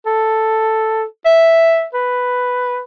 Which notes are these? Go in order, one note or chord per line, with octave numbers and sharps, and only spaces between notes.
A4
E5
B4